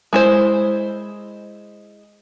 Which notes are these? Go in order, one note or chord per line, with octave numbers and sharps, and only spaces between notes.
G#3 E4 C5